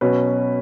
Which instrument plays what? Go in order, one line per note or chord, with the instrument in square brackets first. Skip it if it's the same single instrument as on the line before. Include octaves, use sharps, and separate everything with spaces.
[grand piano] B2 F#3 C#4 B4